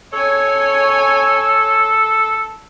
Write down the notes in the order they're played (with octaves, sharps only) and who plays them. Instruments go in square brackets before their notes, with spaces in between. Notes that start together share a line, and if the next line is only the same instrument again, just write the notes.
[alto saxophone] A4 [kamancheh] C#5 G#5